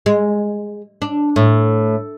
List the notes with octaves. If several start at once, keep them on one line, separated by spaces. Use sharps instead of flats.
G#3
D4
A2